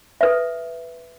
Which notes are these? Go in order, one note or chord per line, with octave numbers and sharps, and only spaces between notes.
A4 B4 E5